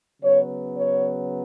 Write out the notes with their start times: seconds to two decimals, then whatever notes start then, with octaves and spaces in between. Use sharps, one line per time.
0.22 C#3 F#3 B3 C#5
0.75 C#5